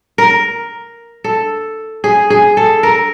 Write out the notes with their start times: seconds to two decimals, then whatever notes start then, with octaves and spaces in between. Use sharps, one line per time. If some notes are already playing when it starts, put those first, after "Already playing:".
0.18 A#4
1.24 A4
2.04 G#4
2.30 G#4
2.57 A4
2.83 A#4